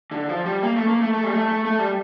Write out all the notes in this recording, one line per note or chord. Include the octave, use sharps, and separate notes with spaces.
D3
F3
G3
A#3
A3
A#3
A3
A3
G3
A3
A3
A3
G3